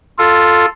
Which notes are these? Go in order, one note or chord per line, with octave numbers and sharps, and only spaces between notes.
F4 A4